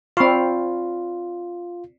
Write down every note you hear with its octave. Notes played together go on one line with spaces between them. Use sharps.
C4 F4 D5 F5 B5 C#6